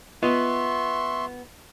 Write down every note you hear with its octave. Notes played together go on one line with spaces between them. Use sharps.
B3 F4 D#5 E5 C6 C#6